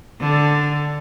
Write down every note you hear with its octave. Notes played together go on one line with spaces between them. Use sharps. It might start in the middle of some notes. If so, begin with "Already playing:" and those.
D3